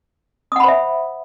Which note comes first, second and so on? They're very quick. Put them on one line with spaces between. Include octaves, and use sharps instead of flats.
D#6 F#5 B5 C5 E5